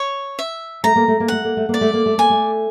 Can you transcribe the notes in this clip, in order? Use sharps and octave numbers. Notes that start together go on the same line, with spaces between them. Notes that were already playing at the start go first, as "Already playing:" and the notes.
Already playing: C#5
E5
A3 A#5
A#3
A3
A#3
A3 F#5
A#3
A3
A#3 D5
A3
A#3
A3
A#3 G#5
A3